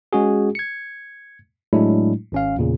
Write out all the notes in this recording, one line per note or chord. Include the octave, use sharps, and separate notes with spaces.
G#3 C#4 F#4 G#4
G#6 C#7
A2 F#3 G#3 A3 D4 E4
G#1 C#4 F5
E2 A#2 C#3